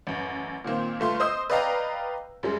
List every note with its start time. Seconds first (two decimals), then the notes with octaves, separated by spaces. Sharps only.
0.07 A1 F#2
0.64 A#2 D#3 A#3 C4
1.00 G1 A3 F4 C6
1.20 C5 D#5 D#6 E6 G6
1.50 B4 D5 D#5 F5 G5 A#5
2.43 F#2 G3 G#3